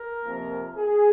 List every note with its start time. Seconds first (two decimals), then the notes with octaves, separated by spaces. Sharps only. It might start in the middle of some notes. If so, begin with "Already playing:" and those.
Already playing: A#4
0.24 F2 C3 F3 A#3
0.77 G#4